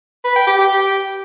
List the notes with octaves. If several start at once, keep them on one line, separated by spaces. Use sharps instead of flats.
B4
G5
G4
G4